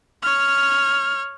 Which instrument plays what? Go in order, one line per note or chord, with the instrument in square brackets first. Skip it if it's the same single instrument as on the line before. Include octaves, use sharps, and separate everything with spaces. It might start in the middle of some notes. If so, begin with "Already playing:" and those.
[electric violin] C#5 F6